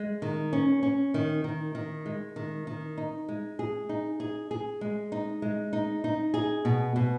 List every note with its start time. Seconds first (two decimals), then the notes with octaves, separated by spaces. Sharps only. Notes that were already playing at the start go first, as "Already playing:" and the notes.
Already playing: G#3
0.22 D#3
0.53 C#4
0.83 C#4
1.14 D#3
1.44 D#3
1.75 D#3
2.06 G#3
2.36 D#3
2.67 D#3
2.98 D#4
3.29 G#3
3.59 G#4
3.89 D#4
4.20 G#4
4.51 G#4
4.81 G#3
5.12 D#4
5.42 G#3
5.73 D#4
6.04 D#4
6.34 G#4
6.65 B2
6.96 B2